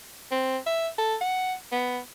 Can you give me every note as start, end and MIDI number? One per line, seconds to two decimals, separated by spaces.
0.32 0.58 60
0.66 0.88 76
0.98 1.15 69
1.21 1.54 78
1.72 1.99 59